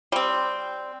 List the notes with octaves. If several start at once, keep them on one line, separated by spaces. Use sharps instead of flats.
G3 C4